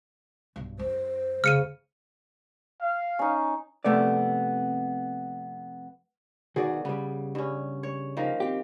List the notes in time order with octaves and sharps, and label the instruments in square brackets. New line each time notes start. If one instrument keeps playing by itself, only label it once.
[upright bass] B1 G2
[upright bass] F#2 [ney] C5
[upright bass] F1 [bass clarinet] C#3 [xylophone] F6 C#7 D#7
[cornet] F5
[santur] C#4 D#4
[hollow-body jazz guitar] F2 C3 A3 B3 D5
[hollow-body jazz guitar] B1 D#3 F#4 [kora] G#4 D5
[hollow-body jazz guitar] C#3 G3 [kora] B3
[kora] G2 C#4
C#5
D#3 F3 A#3
[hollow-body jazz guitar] C4 G4